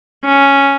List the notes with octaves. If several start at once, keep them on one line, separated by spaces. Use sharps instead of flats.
C#4